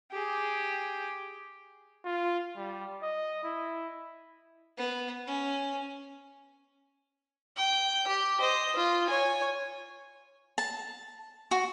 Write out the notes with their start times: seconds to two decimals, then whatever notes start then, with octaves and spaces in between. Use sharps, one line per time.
0.11 G4 G#4
2.05 F4
2.57 G3
3.03 D#5
3.44 E4
4.78 B3
5.27 C#4
7.57 G5
8.08 G4
8.40 C5 D#5
8.76 F4
9.05 C#5 G#5
10.58 A5
11.51 F#4